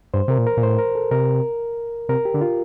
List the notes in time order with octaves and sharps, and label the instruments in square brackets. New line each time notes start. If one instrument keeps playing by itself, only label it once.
[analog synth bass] G2 [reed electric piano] C5
[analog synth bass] C3 [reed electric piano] A#4
[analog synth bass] A#2
[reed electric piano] A#4
[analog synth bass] A#2
[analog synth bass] A2 [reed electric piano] C5
[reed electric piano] A#4
A4
[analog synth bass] C3 [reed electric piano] A#4
[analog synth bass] C3 [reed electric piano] A#4
[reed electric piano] G4
[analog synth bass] D3
[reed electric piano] F4